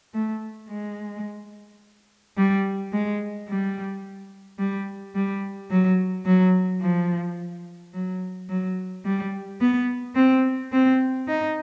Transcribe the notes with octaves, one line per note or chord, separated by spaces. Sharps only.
A3
G#3
G3
G#3
G3
G3
G3
F#3
F#3
F3
F#3
F#3
G3
B3
C4
C4
D#4